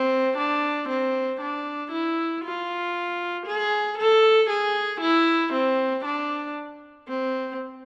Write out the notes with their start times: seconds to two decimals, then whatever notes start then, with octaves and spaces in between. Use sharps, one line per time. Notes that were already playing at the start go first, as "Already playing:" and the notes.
Already playing: C4
0.37 D4
0.89 C4
1.40 D4
1.91 E4
2.44 F4
3.46 G#4
3.98 A4
4.50 G#4
5.01 E4
5.53 C4
6.04 D4
7.08 C4